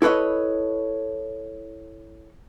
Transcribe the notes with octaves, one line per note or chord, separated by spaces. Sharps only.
E4 A4 B4 C#5 D#5